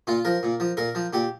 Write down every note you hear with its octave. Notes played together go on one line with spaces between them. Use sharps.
A#2 F4
F3 A#4
A#2
F3
A#2 A#4
F3
A#2 G4